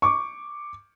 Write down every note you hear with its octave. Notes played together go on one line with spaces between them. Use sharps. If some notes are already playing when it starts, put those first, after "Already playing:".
C#6 D6